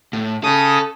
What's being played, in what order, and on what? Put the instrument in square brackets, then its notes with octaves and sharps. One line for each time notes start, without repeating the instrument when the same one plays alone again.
[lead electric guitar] A2
[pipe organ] C#3 D#6 [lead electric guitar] A4